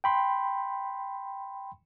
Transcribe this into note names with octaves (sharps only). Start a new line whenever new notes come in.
G5 B5 C6